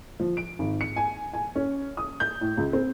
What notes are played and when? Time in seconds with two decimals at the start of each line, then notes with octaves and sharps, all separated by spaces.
0.20 F3
0.37 D7
0.59 G#1
0.81 C#7
0.96 G#5
1.34 G#5
1.56 C#4
1.97 D#6
2.20 G6
2.41 A2
2.57 C#2
2.73 C4